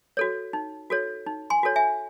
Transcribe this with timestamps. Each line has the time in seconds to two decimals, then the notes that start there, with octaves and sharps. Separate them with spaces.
0.17 F#4 A4 C#5
0.53 D#4
0.90 F#4 A4 C#5
1.26 D#4
1.50 G#5 C6
1.63 F#4 A4 C#5
1.76 E5 G#5